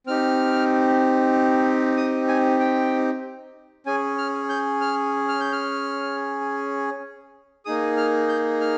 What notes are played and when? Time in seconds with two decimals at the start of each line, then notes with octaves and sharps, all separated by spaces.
0.07 C4 D#4 G4 F6
1.97 D#6
2.28 G#5
2.60 G5
3.86 C#4 G#4 G#5
4.18 F6
4.49 G6
4.81 F6
5.29 F6
5.40 G6
5.52 F6
7.65 A#3 D#4 G#4 D#6
7.97 F6
8.28 G6
8.61 F6